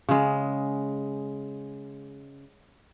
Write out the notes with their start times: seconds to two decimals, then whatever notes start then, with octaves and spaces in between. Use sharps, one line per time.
0.09 C#3 G#3